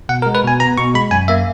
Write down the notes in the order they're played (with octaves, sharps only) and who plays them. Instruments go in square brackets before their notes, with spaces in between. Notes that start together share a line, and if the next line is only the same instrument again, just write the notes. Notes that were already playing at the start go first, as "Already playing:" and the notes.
[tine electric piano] B2 F#5
A#4
G#3
B4
B2 G#5
B3 A#5
B2 C#6
G#3 B5
F#2 G#5
A#3 E5